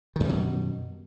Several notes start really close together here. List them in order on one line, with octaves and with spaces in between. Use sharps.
D#3 F#2 G3 B2